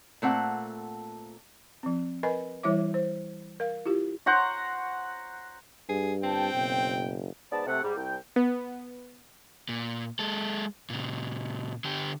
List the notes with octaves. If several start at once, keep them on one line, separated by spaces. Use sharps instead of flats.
A#2 A3 C4 F#5
F3 C4
A#4 B4 D#5 G#5 B5
E3 G3 E4 C#5 E5 D6
C5
A#4 F5
E4 F4 G4
C5 F#5 A#5 C#6
G2 G#4
G1 F2 C4 G5 A5
F#1 B2
G#2 B3 D5 A5
C3 A3 F#5
G#2 G3
C2 G5
B3
A#2
G#3 A4
A#2 C#3
D3 G4